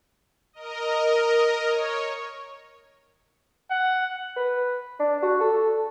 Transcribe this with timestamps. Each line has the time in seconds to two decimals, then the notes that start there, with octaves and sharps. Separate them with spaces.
0.53 A#4 D#5
1.69 C#5
3.71 F#5
4.37 B4
5.00 D4
5.23 F#4
5.41 A4